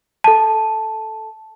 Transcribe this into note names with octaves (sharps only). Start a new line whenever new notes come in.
A4 A5